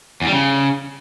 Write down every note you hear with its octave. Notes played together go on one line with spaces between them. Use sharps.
E2
G3
C#3